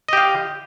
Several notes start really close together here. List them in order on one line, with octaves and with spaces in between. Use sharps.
D#5 G4 F5